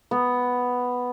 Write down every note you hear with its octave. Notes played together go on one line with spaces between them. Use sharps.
B3